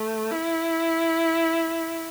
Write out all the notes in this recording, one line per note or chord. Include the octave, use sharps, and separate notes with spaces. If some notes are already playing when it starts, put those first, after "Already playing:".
Already playing: A3
E4